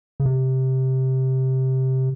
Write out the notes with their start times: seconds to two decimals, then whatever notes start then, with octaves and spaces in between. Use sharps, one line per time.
0.20 C#3
0.26 C3